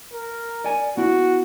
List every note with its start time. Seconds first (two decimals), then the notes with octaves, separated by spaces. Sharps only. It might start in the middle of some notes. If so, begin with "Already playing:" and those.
0.13 A#4
0.64 D5 G#5
0.97 B3 E4 F#4